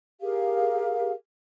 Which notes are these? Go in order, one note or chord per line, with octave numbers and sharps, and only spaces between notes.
G4 G#4 A#4 F5